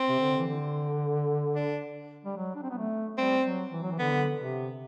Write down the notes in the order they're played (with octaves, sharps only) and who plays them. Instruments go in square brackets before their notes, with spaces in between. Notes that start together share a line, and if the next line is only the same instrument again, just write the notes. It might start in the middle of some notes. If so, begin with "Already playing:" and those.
Already playing: [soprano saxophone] C4
[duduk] C3
D3
E3
D3
[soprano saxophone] D4
[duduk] G3
F#3
D4
C4
B3
A3
[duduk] G3 [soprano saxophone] C4
[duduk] F#3
E3
F#3
E3
[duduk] D3 [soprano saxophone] B3
[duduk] C3